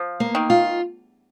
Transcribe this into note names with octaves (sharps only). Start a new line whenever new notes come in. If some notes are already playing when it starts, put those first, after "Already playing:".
Already playing: F3
A#3
D#3
F4